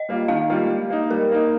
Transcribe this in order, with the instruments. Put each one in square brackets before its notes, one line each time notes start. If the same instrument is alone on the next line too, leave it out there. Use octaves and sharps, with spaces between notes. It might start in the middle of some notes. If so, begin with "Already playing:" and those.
Already playing: [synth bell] D#5
[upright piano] G3 A#3 F4
[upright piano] D#3 [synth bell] F5
[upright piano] G3 A#3 F4
G3
A#3 D#4
[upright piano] G3 [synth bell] A#4
[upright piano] A#3 D#4